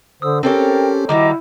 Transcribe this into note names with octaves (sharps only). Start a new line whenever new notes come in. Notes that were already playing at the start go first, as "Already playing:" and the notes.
D3 C5 D#6 E6
C4 C#4 G4 A4 A#4 C#5 G5
D#3 G3 E4 F#4 D#5 A#5 D6